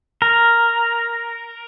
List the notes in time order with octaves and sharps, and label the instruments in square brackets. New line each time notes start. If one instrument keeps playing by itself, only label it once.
[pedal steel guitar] A#4